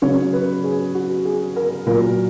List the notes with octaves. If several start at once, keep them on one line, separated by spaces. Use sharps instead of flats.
C#3 F#3 C#5
B4
G#4
F#4
G#4
A#4
A#2 F#3 A#4